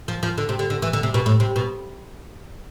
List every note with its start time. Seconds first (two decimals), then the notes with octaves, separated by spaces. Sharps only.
0.08 F3
0.23 F3
0.38 D3
0.49 C3
0.59 D3
0.70 D3
0.82 E3
0.93 D3
1.03 C3
1.14 B2
1.26 A2
1.40 C3
1.56 B2